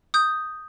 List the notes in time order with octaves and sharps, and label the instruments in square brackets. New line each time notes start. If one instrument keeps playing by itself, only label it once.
[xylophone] D#6 G6